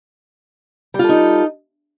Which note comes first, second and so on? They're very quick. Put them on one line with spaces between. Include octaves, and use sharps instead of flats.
G3 F4 A4 D#4